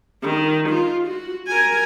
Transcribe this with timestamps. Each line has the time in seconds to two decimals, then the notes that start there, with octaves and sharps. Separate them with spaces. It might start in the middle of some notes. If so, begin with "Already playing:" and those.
0.22 D#3
0.69 F4
1.07 F#4
1.47 A#4 G#5